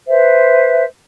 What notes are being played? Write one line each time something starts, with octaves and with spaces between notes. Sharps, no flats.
B4 C5 E5